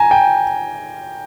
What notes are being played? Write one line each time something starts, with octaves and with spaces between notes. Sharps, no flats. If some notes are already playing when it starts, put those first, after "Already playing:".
Already playing: G#5 A#5
G5